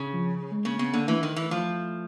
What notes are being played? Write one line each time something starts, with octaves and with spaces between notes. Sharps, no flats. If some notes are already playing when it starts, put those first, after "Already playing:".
Already playing: C#3
F3
G#3
C#3 A#3
C#3 B3
D3 A#3
E3 A3
D#3
E3
F3